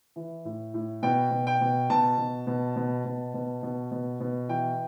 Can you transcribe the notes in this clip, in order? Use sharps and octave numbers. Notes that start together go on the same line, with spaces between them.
E3
A2
A2
B2 G5
B2
G5
B2
B2 A5
B2
B2
B2
B2
B2
B2
B2
B2
E3 G5